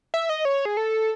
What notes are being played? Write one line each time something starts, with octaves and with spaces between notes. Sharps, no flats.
E5
D#5
C#5
G#4
A4